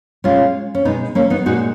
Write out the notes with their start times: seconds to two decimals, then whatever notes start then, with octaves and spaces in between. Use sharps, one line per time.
0.24 B2 G#3 C#4 F4
0.75 C#4
0.85 B2 G#3 B3 D#4
1.15 A#3 C#4
1.30 B3 D#4
1.46 A#2 G#3 D#4 F#4